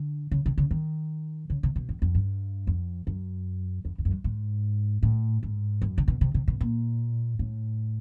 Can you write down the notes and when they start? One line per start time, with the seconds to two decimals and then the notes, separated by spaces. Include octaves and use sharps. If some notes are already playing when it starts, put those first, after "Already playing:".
Already playing: D3
0.31 C#3
0.46 C3
0.58 C#3
0.71 D#3
1.50 C#3
1.63 C3
1.76 B2
1.89 F2
2.02 F2
2.15 G2
2.67 F2
3.07 F#2
3.85 F2
3.98 F2
4.05 F#2
4.11 G2
4.24 G#2
5.03 A2
5.43 G#2
5.82 F#2
5.98 C3
6.08 B2
6.21 C3
6.34 C3
6.48 B2
6.61 A#2
7.39 A2